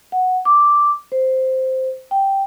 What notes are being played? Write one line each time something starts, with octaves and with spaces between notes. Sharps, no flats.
F#5
D6
C5
G5